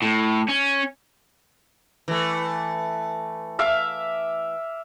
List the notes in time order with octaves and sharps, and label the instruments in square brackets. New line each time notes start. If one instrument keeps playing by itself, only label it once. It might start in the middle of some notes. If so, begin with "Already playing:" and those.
[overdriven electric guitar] A2
C#4
[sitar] E3 A3
[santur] E5 F5 D6